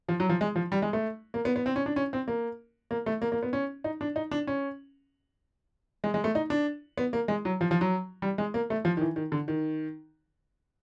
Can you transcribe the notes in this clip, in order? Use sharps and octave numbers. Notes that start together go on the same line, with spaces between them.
F3
F#3
F3
G#3
F3
G3
G#3
A3
A#3
B3
B3
C4
C#4
D4
C#4
C4
A#3
A#3
A3
A#3
A#3
B3
C#4
D#4
D4
D#4
D4
C#4
G#3
G#3
A3
D#4
D4
B3
A#3
G#3
F#3
F3
F3
F#3
G3
G#3
A#3
A3
F3
D#3
E3
D#3
D3
D#3